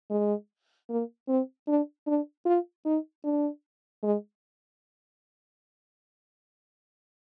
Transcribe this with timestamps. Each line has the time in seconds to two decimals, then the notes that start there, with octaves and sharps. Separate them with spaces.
0.11 G#3
0.90 A#3
1.29 C4
1.68 D4
2.07 D4
2.46 F4
2.85 D#4
3.24 D4
4.03 G#3